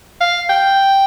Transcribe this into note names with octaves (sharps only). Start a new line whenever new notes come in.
F5
G5